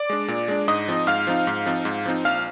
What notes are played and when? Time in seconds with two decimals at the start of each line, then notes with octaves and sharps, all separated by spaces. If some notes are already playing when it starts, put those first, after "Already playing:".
Already playing: D5 D6
0.10 G#3 D4
0.28 A#2
0.48 G#3 D4
0.68 G#2 D#5 D#6
0.88 F3 C4 D#4
1.07 G#2 F5 F6
1.27 F3 C4 D#4
1.47 G#2
1.66 F3 C4 D#4
1.85 G#2
2.06 F3 C4 D#4
2.25 A#1 F5 F6